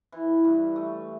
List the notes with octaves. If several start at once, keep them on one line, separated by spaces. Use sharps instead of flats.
E3
G2
A3